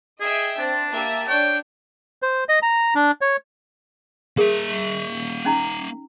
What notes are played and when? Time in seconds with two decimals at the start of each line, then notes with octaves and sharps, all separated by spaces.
0.21 G#4 D#5 E5 G5
0.58 C4 D4 A5
0.91 A#3 G4 E5
1.29 D4 C#5 G5
2.22 C5
2.49 D#5
2.62 A#5
2.95 D4
3.21 C#5
4.38 A#3 G#4 A#4 E5
5.45 C#4 D#4 A#5